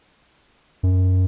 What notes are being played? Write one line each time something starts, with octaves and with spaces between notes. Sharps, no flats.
F#2